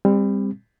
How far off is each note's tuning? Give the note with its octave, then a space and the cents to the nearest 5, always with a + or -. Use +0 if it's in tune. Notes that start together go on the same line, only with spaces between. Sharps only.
G3 +30 C4 +0